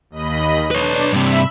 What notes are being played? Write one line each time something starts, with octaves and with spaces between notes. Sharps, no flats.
D#2 D#5 B5
D4 B4 C#5
G2 C3 E5 B5